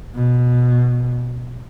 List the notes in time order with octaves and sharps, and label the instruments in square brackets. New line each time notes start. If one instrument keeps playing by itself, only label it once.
[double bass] B2